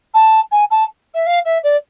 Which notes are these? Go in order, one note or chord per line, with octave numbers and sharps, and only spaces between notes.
A5
G#5
A5
E5
F5
E5
D5